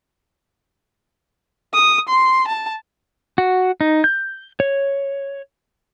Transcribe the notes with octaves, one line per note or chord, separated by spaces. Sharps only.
D#6
C6
A5
F#4
D#4
G6
C#5